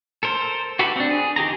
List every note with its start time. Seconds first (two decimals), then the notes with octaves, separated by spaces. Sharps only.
0.23 A4 A#4 C5
0.79 F#4 G4 A4 B4
0.96 C4 D4
1.10 G#4
1.36 D#3 G4 G#4 A#5